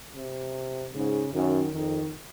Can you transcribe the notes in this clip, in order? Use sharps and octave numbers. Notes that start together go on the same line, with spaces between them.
C3
G#2 C#3
F#2 D#3
F2 D#3